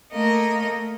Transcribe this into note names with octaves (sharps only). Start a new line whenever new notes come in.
A3 A#3 D#5